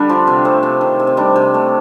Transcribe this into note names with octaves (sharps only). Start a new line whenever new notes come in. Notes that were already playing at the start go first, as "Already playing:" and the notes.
Already playing: D3 G3 D4
F3
C3
A3 C4
C3
D#3
C3
C4
G3 D4
C3
A3